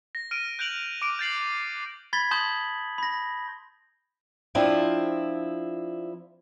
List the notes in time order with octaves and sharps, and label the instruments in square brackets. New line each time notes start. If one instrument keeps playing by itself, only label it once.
[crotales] A#6
F6 D7 D#7
F#6 G6 D7 F7 F#7
D6 D7
G6 A6 C7 F#7
[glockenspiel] B5 G#6 A6 B6 G7
A5 C6 D#6 G6 F#7 G7
B5 A#6
[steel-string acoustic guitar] F3 C4 D4 E4 F4